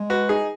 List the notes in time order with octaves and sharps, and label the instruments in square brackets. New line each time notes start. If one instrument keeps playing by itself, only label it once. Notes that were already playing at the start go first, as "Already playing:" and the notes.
Already playing: [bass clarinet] G#3
[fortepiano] F#4 B4
D#4 G#4